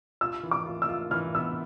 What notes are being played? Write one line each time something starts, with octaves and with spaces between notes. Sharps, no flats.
F4 E6
E3
D6
F4
E6
F4
E3 F6
B3 E6